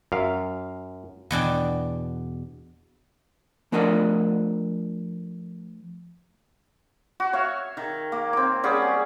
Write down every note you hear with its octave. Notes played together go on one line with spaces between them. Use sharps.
F#2 F5
E2 B2 D4 G5
F3 A3 D4 A#4 D#5 F#5
F#4
C#5 E5 F5
D#3
A#3
C4 D6
G3 C#4 G#4 F#5